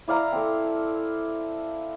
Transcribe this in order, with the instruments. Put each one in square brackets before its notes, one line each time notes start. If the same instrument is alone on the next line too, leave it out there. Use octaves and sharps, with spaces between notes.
[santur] E4 D5 F5 A#5
C4 A4